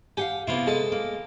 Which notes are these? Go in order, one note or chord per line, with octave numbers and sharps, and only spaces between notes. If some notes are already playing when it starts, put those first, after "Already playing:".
G4 F5 F#5 G#5
C3 A#3 B3 E4 F4
G#3 A4 D#5
A#3